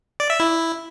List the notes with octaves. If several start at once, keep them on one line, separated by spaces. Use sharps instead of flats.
D5
E5
E4